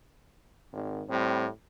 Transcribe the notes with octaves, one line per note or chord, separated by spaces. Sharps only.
G#1
A2 G3 C4